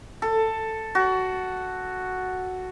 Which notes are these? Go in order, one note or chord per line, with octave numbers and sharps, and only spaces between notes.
A4
F#4